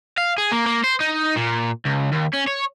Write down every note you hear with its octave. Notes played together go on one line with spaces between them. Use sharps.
F5
G#4
A#3
A#3
C5
D#4
A#2
C#2
D#2
C#4
C#5